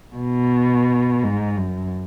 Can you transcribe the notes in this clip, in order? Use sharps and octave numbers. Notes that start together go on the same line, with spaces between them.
B2
G#2
F#2